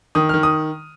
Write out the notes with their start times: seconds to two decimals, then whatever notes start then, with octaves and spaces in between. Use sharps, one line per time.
0.15 D#3 D#6
0.29 D#3 F6
0.43 D#6